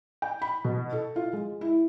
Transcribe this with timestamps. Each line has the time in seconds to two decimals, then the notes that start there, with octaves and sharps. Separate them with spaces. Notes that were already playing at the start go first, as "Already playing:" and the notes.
0.22 G5
0.42 B5
0.64 B2
0.93 A4
1.16 F4
1.33 G#3
1.61 E4